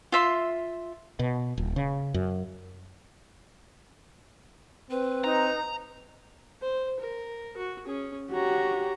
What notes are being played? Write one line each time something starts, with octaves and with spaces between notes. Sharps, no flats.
F4 E5 C6
B2
D#1
C#3
F#2
C4 B4
D#4 A#5
C5
A#4
F#4
C#4 G#4
F#4 G4 C#5 A#5